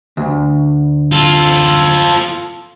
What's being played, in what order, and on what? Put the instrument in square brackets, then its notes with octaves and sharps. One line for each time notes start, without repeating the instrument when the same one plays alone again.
[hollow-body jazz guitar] D2
[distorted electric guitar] F4 A4